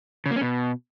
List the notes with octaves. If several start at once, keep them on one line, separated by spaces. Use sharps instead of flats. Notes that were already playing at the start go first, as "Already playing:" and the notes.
C#3
A#3
C#4
B2